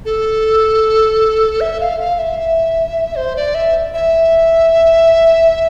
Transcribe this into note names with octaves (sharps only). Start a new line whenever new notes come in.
A4
E5
F5
F5
E5
C5
D5
E5
E5